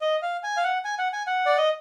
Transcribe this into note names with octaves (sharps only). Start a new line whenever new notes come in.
D#5
F5
G#5
F5
F#5
G#5
F#5
G#5
F#5
D5
D#5